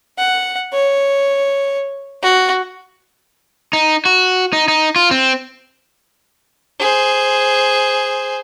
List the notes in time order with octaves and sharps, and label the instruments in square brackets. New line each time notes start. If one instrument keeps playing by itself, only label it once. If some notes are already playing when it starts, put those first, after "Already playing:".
[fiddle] F#5
C#5
F#4
[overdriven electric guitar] D#4
F#4
D#4
D#4
F4
C4
[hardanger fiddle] G#4 C5